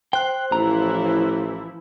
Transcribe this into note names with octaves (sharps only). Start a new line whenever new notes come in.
C5 G5 F#6
A1 E3 F3 E4 A#5